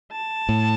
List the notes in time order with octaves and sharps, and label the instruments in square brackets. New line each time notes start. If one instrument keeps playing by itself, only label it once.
[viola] A5
[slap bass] A2